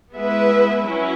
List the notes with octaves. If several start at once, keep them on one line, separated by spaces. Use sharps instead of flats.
G#3 B3 E4 B4 E5
F#3 C#4 E4